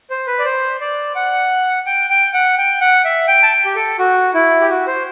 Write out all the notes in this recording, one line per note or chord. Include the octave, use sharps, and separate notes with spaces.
C5
B4
D5
C5
D5
F#5
G5
G5
F#5
G5
F#5
E5
G5
A5
G5
G4
A4
F#4
E4
G4
F#4
C5